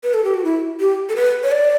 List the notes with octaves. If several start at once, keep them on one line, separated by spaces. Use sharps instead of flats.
B4
A4
G4
F#4
E4
G4
A4
B4
C#5
D5